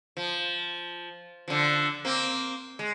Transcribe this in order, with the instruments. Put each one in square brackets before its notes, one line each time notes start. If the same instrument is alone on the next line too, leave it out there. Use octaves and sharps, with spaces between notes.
[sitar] F3
D3 F3
A#3 C4
G#3